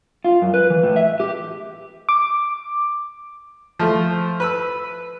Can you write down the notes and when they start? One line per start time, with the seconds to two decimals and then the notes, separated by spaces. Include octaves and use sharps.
0.25 F4
0.42 F#2
0.54 B4
0.70 E3
0.83 A2
0.96 E5
1.20 G4
2.09 D6
3.79 F3 A3
4.40 B4 B5 E6